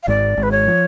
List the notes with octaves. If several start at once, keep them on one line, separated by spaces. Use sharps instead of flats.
F5
G#1 G#2 D5
G#1 G#2
B4
C#5
F3